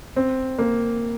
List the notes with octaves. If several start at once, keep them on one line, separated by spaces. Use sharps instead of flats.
C4
A#3